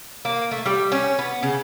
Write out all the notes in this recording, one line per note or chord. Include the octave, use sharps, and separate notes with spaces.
A#3
A3
G3
C#4
B3
C#3